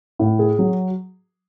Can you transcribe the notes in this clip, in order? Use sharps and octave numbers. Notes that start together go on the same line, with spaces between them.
A2
G#4
F#3